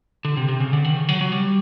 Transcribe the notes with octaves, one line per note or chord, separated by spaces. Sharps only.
D3
C3
C3
C#3
D3
D#3
C#3
F#3
F#3
G3